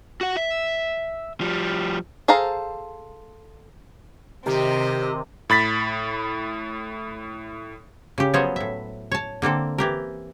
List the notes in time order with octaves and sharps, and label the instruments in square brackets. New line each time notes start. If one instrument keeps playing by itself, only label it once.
[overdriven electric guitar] F#4 F#5
E5
F3 G3
[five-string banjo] G#4 A4 C5 F5 A#5
[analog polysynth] C3 [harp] D#3 [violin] C4 D#5 [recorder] G4
[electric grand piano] A2 B5 A6 B6
[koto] C#3 G4
F3 F#3 B3 G#4 C5 C#5
A2 E5
C#5 A5
D3 A#3 C4 A4
E3 G4 A#4